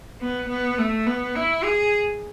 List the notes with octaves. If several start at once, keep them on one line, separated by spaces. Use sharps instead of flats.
B3
B3
A3
B3
E4
G#4